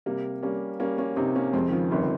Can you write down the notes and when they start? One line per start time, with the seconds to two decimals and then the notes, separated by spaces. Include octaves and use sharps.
0.06 C3 G3 A#3
0.43 G3 A#3 C#4
0.80 G3 A#3 C#4
0.98 A#3 C#4
1.16 C3 C4 D#4
1.35 A#3 C#4
1.53 F2 G#3 C4
1.69 D#3
1.72 C#3 F3
1.91 G1 C3 D#3